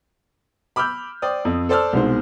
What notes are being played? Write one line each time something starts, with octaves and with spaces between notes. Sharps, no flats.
B5 D6 E6 F6 G6
C5 D5 G5 D#6
F2
A4 C5 D5 A5 E6 F6
C2 B2 G#3 D#4 C5